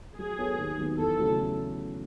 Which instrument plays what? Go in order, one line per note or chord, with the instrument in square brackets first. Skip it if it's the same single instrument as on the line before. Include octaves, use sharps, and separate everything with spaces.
[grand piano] F#3 [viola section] G#4
[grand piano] B3 F#4 A4 C#5
D#2
D#3 F#3 B3
[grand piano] E2 [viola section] A4
[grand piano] C#3 F#3 A3 E4